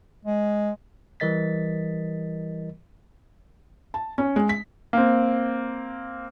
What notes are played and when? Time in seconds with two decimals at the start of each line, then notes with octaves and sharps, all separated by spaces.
0.25 G#3
1.20 E3 G3 A#4 D#5 A6 B6
3.94 A5
4.18 C#4
4.36 G#3
4.49 B6
4.93 A#3 C4